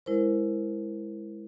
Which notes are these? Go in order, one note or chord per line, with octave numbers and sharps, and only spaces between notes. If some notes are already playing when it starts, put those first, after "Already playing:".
G#3 E4 A#4 C5